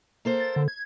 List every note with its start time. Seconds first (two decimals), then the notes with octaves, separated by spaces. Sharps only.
0.25 A#3 A4 C5
0.40 A6
0.56 D3
0.68 G#6